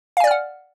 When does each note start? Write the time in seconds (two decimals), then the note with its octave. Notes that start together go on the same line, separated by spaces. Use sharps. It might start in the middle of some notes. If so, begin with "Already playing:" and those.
0.17 F5
0.20 G#5
0.24 D5
0.27 F6
0.31 F#5